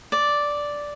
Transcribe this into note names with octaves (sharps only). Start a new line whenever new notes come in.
D5